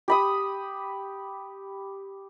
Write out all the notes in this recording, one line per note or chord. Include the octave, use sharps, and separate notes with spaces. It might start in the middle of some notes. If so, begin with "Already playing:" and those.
G4 B5 D#6